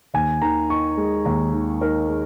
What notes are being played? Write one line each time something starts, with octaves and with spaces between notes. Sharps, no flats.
D#2 G#5
D#3 A#5
D#4 C#6
G#3
D#2 A#5
D#3
D#4 A#4
G#3